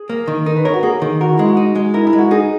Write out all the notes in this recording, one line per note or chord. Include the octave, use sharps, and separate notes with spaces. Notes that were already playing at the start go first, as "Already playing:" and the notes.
Already playing: G#4
A#3
D#3
D#4 A#4
B4
A#4 C#5
F#4
A#3 G#4
D#3
F#4 A#4
E4
G#3
F#4
D#4
G#3
E4 A#4
E4
G#3
F#4
D#4 G#4